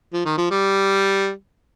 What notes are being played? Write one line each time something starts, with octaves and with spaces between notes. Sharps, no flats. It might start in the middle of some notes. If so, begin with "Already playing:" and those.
F3
D#3
F3
G3